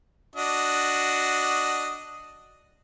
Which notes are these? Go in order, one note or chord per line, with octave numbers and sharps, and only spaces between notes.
D4 F#4 D#5